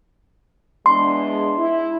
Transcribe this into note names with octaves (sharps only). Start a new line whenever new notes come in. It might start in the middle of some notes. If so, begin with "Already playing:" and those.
E2 G#3 D4 C6
E4